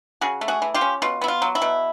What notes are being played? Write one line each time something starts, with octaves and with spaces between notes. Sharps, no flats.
C#3 F#4 G#4
A3
F#4 G#4
E3
F4 G4
C#4
B2 F4
B3 E4
F4
F#3
E4
B2